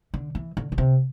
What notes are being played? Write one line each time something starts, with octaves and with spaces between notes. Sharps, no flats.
D3
E3
D3
D3
C3